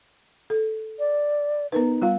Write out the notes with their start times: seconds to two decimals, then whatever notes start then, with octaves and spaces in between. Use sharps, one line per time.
0.50 A4
0.99 D5
1.72 B3 D#4 A#4 B4
2.02 G3 F4 F5